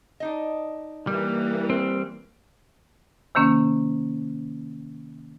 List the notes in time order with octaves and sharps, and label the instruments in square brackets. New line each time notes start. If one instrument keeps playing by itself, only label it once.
[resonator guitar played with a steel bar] D4 D#4 D#5
[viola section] E3 A#3 [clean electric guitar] G3
[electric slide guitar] C4
[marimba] C3 D#3 A#3 C#4